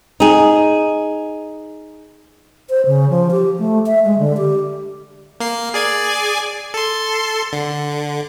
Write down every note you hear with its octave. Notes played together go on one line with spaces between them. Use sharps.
D#4 G#4
C5
C#3
F3
G4
A3
E5
G#3
D3
G4
A#3 C7
G#4 D5 G#5
A4 C6
D3